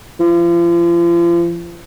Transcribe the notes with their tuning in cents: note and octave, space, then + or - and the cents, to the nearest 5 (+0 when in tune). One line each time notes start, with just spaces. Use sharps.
F3 -40